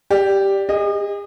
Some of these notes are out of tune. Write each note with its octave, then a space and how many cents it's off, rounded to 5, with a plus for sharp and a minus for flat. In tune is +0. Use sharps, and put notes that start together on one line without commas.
G4 +0 D5 +0
G#4 -45 D#5 +0